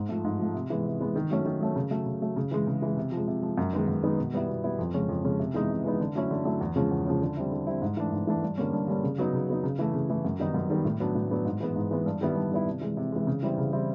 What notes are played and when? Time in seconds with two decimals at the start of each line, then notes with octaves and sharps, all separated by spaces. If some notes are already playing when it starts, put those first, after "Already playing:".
Already playing: G#2
0.09 F3 A3
0.25 G#2
0.39 F3 A3
0.54 C3
0.70 E3 G#3 B3
0.85 C3
1.00 E3 G#3 B3
1.16 D#3
1.30 F#3 A3 C#4
1.46 D#3
1.60 F#3 A3 C#4
1.76 C#3
1.91 F#3 A3
2.06 C#3
2.21 F#3 A3
2.36 C#3
2.51 E3 G#3
2.67 C#3
2.82 E3 G#3
2.97 C3
3.12 F3
3.17 G#3
3.28 C3
3.43 F3 G#3
3.58 F#2
3.73 D#3 G#3 B3 D#4
3.88 F#2
4.03 D#3 G#3 B3 D#4
4.18 B2
4.33 G3 B3 E4
4.49 B2
4.64 G3 B3 E4
4.79 F2
4.94 C#3 F3 G#3 C#4
5.09 F2
5.24 C#3 F3 G#3 C#4
5.39 C3
5.54 E3 G#3 B3 D#4
5.70 C3
5.84 E3 G#3 B3 D#4
6.00 D3
6.15 F#3 A3 C#4 E4
6.31 D3
6.45 F#3 A3 C#4 E4
6.61 E2
6.76 C#3 F3 G#3 C#4
6.91 E2
7.06 C#3 F3 G#3 C#4
7.21 D3
7.37 G3 C4 E4
7.51 D3
7.67 G3 C4 E4
7.82 G#2
7.97 E3 A3 D4
8.12 G#2
8.27 E3 A3 D4
8.43 G2
8.58 D3 G3 A#3 C#4
8.73 G2
8.88 D3 G3 A#3 C#4
9.03 C#3
9.18 F#3 B3 D#4
9.33 C#3
9.48 F#3 B3 D#4
9.64 C#3
9.79 E3 A3
9.94 C#3
10.10 E3 A3
10.25 F#2
10.39 D#3 G3 B3 D#4
10.54 F#2
10.70 D#3 G3 B3 D#4
10.85 A2
11.00 F#3 B3 D4
11.15 A2
11.30 F#3 B3 D4
11.45 G#2
11.60 E3 G#3 B3
11.76 G#2
11.91 E3 G#3 B3
12.06 G2
12.21 D#3 G3 B3 E4
12.36 G2
12.52 D#3 G3 B3 E4
12.67 C3
12.81 E3 G#3
12.97 C3
13.12 E3 G#3
13.27 C#3
13.43 E3 G3 C4 E4
13.58 C#3
13.73 E3 G3 C4 E4